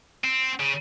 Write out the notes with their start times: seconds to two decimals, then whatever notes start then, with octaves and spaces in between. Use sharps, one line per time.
0.24 C4
0.60 C#3